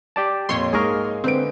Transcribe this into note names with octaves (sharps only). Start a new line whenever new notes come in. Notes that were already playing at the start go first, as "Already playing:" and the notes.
G4 D5 A5
F2 A#2 C#5 C6
G#2 G#3 A#3 G#4 A#4 C#6 D#6
D3 C4 B4 D7